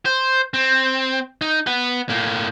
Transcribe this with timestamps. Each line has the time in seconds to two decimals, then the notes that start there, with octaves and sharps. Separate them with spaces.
0.06 C5
0.54 C4
1.41 D#4
1.67 B4 F#5
2.09 A2 A#3